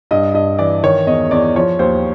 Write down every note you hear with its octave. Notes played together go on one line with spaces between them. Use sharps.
G2 D#5
G2 D#5
E3 D5
D#3 C#5
E2 D#5
E2 D5
F3 C#5
D#2 C5